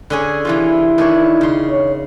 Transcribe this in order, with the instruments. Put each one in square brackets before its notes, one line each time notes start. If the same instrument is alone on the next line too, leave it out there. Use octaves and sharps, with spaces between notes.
[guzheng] D3 C#4 G#4
[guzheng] C3 E3 F4 [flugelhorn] E4
[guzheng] D#3 D4 C#5
C#3 C6
[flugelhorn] C#5